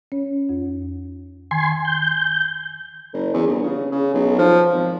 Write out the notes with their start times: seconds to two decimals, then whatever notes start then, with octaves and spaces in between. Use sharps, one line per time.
0.12 C#4 C#5
0.49 F2 F4
1.51 D#3 G#5 C6
1.85 G6
3.13 F#1
3.33 E2
3.47 G1
3.63 C#3
3.92 C#3
4.14 B1
4.38 F3
4.72 G#1